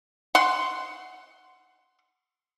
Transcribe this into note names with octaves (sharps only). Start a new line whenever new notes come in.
F#5 C6